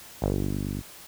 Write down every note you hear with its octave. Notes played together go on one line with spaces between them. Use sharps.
G1